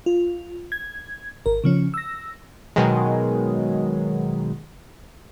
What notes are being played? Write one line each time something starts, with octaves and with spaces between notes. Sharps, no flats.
F4
G#6
G#1 A#4
C#3 F3 C#4
E6 A#6
B2 D#3 F#3 G#3